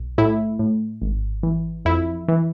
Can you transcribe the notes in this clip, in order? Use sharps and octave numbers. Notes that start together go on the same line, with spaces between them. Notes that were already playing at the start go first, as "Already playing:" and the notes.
Already playing: B1
A2 E4
A2
G#1
E3
F2 E4
E3